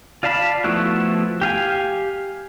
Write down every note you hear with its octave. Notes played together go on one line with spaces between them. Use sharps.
F4 D5 F5 A5 B5
F3 A3 B3 E4 F#4
G4 F5 G#5